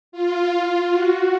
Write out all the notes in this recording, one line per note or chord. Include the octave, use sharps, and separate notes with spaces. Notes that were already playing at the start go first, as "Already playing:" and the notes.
F4
F#4